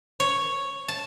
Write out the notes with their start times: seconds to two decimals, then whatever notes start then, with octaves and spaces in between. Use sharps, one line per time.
0.20 C#5
0.88 A5